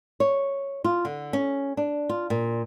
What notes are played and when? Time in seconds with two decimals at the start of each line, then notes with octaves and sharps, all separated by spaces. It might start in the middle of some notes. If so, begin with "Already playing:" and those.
0.20 C#5
0.84 F4
1.05 D3
1.33 C#4
1.77 D4
2.09 F4
2.30 A#2